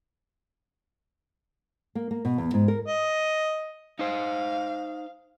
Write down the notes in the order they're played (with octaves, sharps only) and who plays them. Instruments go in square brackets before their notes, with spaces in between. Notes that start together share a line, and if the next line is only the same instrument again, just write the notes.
[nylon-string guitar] A#3
A#3
B2
E2
G#2
A#4
[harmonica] D#5
[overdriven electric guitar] D#4 C5 [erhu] F5